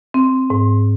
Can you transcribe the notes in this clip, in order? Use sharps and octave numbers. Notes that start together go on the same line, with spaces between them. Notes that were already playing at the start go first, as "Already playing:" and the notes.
C4
G#2